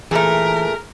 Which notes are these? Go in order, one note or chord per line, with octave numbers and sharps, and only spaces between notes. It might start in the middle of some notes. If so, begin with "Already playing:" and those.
A#2 E3 A3 G#4 A#4